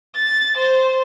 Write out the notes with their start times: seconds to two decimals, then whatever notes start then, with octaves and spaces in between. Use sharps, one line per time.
0.15 A6
0.57 C5